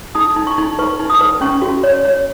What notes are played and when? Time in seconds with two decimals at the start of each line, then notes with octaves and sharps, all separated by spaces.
0.15 D#4 D#6
0.36 D#4
0.47 C#6
0.58 D#4
0.79 B4 C#6
1.00 D#4
1.10 D#6
1.21 B4
1.41 C#4 C#6
1.62 F#4
1.84 C#5
2.05 C#5